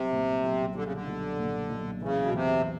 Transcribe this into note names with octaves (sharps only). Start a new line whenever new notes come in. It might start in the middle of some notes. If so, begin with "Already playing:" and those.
Already playing: B1 C3 G3
A#2
B1
D3 G3
C#3
D3
B1
A#2
B1
C#3 E3
B2
E2 C3